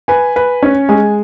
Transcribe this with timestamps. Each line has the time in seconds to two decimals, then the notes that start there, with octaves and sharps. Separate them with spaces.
0.08 B4 G#5
0.36 B4
0.62 C#4
0.89 G#3 G#5